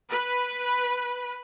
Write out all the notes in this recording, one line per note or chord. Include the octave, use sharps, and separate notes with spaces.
B4